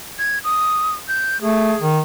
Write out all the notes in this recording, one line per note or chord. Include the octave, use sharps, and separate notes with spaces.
G#6
D#6
G6
A3 G#4
D#3